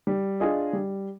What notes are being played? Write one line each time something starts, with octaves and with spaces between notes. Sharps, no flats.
G3
D4 F4 G#4 D#5
G3